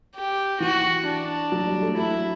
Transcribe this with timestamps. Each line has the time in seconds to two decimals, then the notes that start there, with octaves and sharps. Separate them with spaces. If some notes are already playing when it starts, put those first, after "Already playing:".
0.15 G4
0.60 E3 F#4
1.06 D4
1.52 F#3
1.67 G3
1.82 A3
1.97 F#3 E4